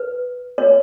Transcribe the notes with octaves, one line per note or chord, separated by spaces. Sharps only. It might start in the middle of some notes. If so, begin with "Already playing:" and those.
Already playing: B4
C#5